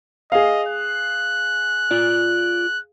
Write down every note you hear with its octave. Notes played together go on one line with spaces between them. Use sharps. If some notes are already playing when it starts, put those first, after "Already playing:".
G#4 D#5 F5
F#6
F4 D5